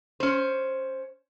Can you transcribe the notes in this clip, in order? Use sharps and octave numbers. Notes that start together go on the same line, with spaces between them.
C#4 C5